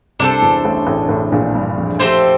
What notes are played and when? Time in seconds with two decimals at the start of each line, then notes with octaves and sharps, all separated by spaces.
0.19 C2 C3 D4 A4 C5
0.42 E2 E3
0.65 A1 A2
0.86 A1 A2
1.09 A1 A2
1.32 A#1 A#2
1.55 G2
1.78 F2
1.99 F2 A3 C4 G4 C5